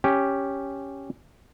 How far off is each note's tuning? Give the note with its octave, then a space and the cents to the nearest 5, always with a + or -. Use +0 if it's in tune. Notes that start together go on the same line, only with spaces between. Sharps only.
C#4 +0 G4 +0